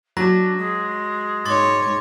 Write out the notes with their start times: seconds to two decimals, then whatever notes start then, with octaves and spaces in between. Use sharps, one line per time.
0.17 F#3 D4 A#6
0.57 G#3
1.45 G#2 C#5 C6 D6 A6